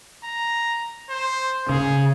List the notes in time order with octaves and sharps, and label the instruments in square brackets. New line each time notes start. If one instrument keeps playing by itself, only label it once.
[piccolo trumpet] A#5
C5
[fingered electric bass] C#3 [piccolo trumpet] G#4